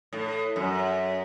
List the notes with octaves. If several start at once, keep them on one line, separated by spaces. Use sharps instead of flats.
A2
F#2